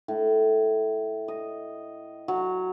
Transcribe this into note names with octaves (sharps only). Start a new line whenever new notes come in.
A2
D#5
F#3